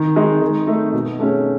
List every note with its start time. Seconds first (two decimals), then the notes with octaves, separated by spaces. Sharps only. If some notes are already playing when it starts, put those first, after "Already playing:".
Already playing: D#3
0.16 G#3 D#4 G#4
0.42 D#3
0.67 A3 D#4
0.93 B2
1.19 A3 C#4 G#4